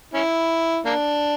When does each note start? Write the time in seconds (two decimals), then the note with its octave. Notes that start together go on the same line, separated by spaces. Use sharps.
0.14 C#4 E4
0.85 A#3 D4